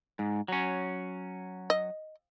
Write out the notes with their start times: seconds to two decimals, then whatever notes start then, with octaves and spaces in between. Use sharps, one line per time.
0.19 G#2
0.48 F#3 C#4
1.70 D#5